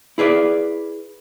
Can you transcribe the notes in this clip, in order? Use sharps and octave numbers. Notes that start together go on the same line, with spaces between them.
E4 G#4 B4 D5